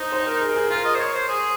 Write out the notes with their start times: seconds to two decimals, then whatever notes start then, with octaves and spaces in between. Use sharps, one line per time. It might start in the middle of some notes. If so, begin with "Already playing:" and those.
Already playing: D#4 C5
0.12 C5
0.27 A#4
0.41 G#4
0.49 A#4
0.56 G#4
0.70 F4 A#4
0.85 D#5
0.94 C5
0.99 C#5
1.14 C5
1.28 G#4